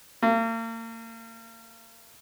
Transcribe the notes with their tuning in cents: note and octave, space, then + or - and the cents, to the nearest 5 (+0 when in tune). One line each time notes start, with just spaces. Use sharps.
A#3 -40